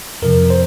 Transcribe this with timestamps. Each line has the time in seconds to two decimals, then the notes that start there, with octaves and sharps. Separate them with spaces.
0.22 F2 C3 F3 A#4
0.50 C5